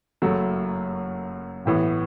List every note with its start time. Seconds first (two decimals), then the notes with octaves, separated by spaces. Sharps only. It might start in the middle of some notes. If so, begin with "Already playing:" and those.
0.22 F#1 F#2 F#3 A3
1.65 A1 A2 E3 B3